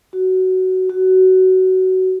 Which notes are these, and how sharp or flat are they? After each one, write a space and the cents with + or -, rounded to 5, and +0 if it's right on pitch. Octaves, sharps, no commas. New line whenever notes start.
F#4 +15
F#4 +20